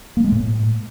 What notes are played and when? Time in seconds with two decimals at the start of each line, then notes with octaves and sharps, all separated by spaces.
0.17 A#3
0.24 G#3
0.32 A2